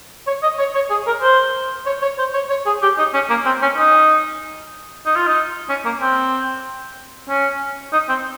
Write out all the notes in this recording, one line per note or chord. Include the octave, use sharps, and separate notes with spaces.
C#5
D#5
C#5
C#5
G#4
A#4
C5
C#5
C#5
C5
C#5
C#5
G#4
G4
D#4
C#4
A#3
C4
C#4
D#4
D#4
F4
D#4
C#4
A#3
C4
C#4
D#4
C4